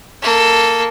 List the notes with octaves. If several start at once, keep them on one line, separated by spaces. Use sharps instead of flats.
A#3 A4